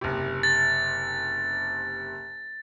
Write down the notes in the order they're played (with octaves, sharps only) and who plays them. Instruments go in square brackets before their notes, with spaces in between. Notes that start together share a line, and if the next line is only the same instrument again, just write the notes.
[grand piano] F#1 C3
[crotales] A6